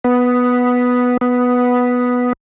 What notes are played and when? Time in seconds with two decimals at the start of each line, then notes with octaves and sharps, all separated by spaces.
0.04 B3
1.21 B3